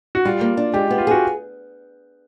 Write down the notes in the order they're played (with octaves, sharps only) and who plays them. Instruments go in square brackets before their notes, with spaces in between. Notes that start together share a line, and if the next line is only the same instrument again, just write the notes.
[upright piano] F#4
[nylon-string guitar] G3 [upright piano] F4
[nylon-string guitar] A#3
D4
[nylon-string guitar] G#3 [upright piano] G4
[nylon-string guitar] B3
[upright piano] F4
[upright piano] F#4 [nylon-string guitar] G#4